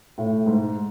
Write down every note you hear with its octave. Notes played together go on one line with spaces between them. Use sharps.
A2
G#2